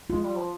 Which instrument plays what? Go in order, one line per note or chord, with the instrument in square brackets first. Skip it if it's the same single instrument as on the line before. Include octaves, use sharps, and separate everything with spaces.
[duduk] G#3 [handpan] F4
[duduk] G3
F3